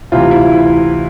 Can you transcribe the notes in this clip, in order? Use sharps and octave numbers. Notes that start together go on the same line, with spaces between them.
D2 C3 E3 F4
E4
E4